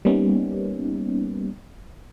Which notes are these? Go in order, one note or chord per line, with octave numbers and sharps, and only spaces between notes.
G3 A#3 B3 C#4 D#4